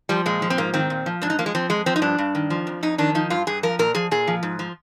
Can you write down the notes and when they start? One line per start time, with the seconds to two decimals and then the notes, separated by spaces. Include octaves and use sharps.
0.09 F3 G3
0.26 A#2 G#3
0.42 F3
0.50 C4
0.58 G#2 A#3
0.74 D#3 C4
0.90 A#2
1.06 F3
1.22 G#2 D4
1.30 D#4
1.39 F3 A#3
1.46 G#3
1.55 F3 C4
1.70 F2 G#3
1.86 F3 C4
1.96 D#4
2.02 G2 D4
2.18 G2
2.35 D#3
2.50 F3
2.67 F2
2.83 F2 D#4
2.98 D#3 D4
3.15 F3 D#4
3.30 G2 F4
3.47 G2 G#4
3.63 F3 A#4
3.79 A#2 A#4
3.95 F3 G#4
4.11 A#2 G#4
4.27 F3
4.43 G#2
4.59 F3